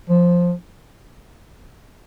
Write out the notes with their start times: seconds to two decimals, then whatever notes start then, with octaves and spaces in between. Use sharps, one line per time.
0.09 F3